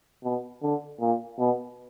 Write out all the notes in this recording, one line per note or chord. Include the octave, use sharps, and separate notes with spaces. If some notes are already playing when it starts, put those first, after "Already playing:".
B2
D3
A#2
B2